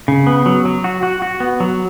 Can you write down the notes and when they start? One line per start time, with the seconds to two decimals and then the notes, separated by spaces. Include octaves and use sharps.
0.08 C#3
0.27 B3
0.46 F#3
0.65 F#3
0.84 F#4
1.03 F#4
1.22 F#4
1.40 B3
1.60 F#3